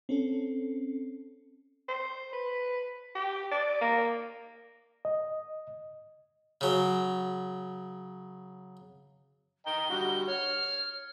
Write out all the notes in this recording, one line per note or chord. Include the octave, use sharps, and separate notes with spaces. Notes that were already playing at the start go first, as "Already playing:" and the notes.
C4 C#4 A4
C5
B4
G4
D5
A#3
D#5
C#3 F#3
D#5 G5 A#5 G7
D3 G3 F#4
C#5 F6